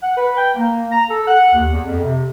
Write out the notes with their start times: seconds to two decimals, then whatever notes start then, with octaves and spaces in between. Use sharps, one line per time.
0.02 F#5
0.16 B4
0.37 G5
0.55 A#3
0.91 A#5
1.09 A4
1.28 F#5
1.53 D#2
1.72 E2
1.86 F2
2.04 C3